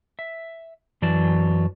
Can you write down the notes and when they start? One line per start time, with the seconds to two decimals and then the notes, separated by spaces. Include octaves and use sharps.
0.19 E5
1.02 F#2 E3 F#3 D5 A5